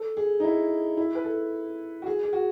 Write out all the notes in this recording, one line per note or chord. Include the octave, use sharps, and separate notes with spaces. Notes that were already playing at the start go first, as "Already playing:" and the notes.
Already playing: A4
G#4
D#4
E4
E4
B4
A4
F#4
G#4
G#4
F#4